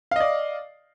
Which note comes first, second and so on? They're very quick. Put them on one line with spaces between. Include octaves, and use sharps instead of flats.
F5 D#5 D5